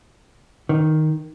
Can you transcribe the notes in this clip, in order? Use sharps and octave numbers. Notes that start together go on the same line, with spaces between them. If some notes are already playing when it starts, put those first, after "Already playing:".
D#3